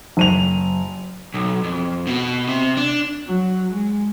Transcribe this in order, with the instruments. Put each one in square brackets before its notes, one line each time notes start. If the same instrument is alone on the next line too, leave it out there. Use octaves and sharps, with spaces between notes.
[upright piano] F#1 D#7 F7
[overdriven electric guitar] B1
F2
B2
C3
D4
[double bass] F#3
G#3